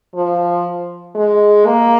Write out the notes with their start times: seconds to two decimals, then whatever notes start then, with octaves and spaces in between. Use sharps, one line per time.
0.15 F3
1.15 G#3
1.66 A#3